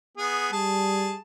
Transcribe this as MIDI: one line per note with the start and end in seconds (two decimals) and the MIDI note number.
0.17 0.52 59
0.17 0.52 68
0.52 1.16 55
0.52 1.19 68
0.52 1.19 81